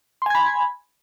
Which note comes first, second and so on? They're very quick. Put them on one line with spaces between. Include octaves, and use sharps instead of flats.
C6 G#5 G#6 B5